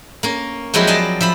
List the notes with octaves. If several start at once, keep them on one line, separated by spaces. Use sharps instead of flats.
A#3 C#4
F3 F#3 G#3 C4 E4 G4
D5 D#5 G#5 A5
F3 E5 B5